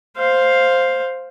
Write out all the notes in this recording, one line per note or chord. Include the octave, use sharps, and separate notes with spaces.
C5 F5